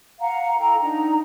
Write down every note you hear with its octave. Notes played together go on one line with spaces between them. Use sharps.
F5 F#5 A#5
E4 A4 G5 A#5
D4 D#4 A#5